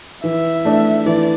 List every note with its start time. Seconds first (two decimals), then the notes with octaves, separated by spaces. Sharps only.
0.23 E3 E5
0.65 A3 D4
1.06 E3 D5